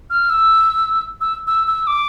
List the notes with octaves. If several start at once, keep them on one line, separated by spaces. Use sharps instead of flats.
F6
E6
E6
E6
E6
D6